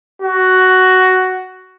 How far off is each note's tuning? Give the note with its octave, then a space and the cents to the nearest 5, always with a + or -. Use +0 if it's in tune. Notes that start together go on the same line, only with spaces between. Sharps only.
F#4 +10